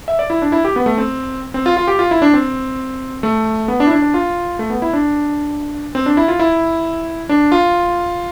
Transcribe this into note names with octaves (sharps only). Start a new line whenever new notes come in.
E5
D5
E4
D4
E4
G4
B3
A3
C4
C4
F4
F4
G4
F4
E4
D4
C4
A3
B3
D4
E4
D4
D4
F4
A3
B3
E4
D4
C4
D4
E4
F4
E4
D4
F4